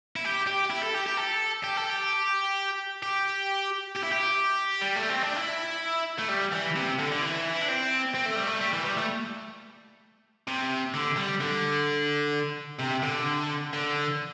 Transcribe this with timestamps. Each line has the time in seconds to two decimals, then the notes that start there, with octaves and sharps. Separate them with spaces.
0.16 E4
0.25 G4
0.47 G4
0.70 E4
0.83 A4
0.94 G4
1.06 G4
1.17 A4
1.64 G4
1.77 A4
1.90 G4
3.03 G4
3.96 G4
4.04 E4
4.11 G4
4.82 G3
4.96 A3
5.09 C4
5.22 D4
5.36 E4
6.19 A3
6.29 G3
6.52 E3
6.76 C3
6.99 D3
7.11 D3
7.22 E3
7.54 E4
7.62 D4
7.68 C4
8.15 C4
8.26 A3
8.36 G3
8.47 A3
8.61 G3
8.73 E3
8.85 G3
8.97 A3
10.48 C3
10.94 D3
11.17 G3
11.41 D3
12.80 C3
13.03 D3
13.73 D3